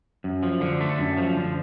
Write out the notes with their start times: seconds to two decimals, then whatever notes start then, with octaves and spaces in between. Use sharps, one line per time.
0.24 F#2
0.43 F3
0.61 D3
0.81 A3
0.98 F#2
1.17 F3
1.36 D3